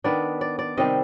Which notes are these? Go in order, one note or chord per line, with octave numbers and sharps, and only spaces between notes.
D#3 B3 D4 D5
D5
D5
C3 D#3 G3 C4 D#5